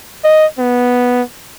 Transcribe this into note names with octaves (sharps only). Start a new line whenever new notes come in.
D#5
B3